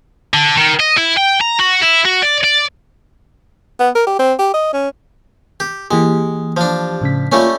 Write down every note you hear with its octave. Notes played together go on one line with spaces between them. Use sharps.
D3
D#3
D#5
E4
G5
A#5
F#4
E4
F#4
D5
D5
B3
A#4
G4
C4
G4
D#5
C#4
G4
E3 G#3 A#3 G4
F3 D4
A2 C#3 B6
G3 A3 A#3 C#4 F4